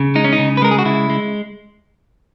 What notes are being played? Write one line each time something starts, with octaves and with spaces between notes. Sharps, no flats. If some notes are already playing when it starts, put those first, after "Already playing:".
Already playing: C#3
G#3 D#4
C#4
D#4
C#3
B4
G#3 A#4
G#4
F#4
C#3 E4
G#3